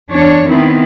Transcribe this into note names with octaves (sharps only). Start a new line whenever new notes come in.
E2 D4 C#5
D#3 B3 C4 E4